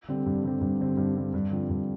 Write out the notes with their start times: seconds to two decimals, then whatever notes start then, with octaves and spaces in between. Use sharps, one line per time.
0.08 D3 G3 C4
0.26 G2
0.44 D3 G3 C4
0.61 G2
0.80 D3 G3 C4
0.97 G2
1.16 D3 G3 C4
1.34 G2
1.51 D3 F3 C4
1.70 G2